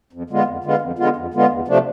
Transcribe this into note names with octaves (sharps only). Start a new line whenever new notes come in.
F2
D3 G#3 B3 F4
F2
D3 G#3 B3 F4
F2
D3 G#3 B3 F4
F2
D3 G#3 B3 F4
E2
C3 F3 A3 D4